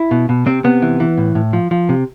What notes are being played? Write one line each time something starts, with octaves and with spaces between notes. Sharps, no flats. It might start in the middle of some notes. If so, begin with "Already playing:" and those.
Already playing: E4
B2
B2
C3 C4
C3 B3
E3
E3
A2
A2
F3
F3
C3